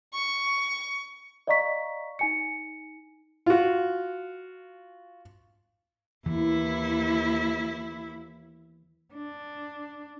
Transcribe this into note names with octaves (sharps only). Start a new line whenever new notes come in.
C#6
D5 D#5 F5 A#5 C#6 B6
D#4 G#5 C#7
F4 F#4
D#2 E3 E4
D4